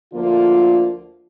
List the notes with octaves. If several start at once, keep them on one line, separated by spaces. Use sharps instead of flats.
D2 D3 F3 A#3 F4